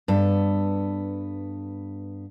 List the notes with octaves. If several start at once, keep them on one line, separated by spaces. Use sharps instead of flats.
G2 B3 A4